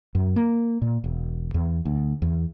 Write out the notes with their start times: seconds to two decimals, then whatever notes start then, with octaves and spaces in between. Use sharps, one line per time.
0.15 F#2
0.36 A#3
0.82 A#2
1.04 E1
1.54 E2
1.85 D2
2.22 E2